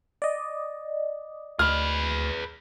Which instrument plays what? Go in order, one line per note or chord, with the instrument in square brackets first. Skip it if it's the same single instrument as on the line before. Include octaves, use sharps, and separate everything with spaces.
[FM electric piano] D5 D#5
[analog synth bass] D2 [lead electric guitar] G#4 B4 [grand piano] F6